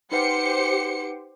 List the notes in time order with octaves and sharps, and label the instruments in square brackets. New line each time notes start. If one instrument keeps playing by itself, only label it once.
[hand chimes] D#4 B4 F#5 [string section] G4 C5 C#7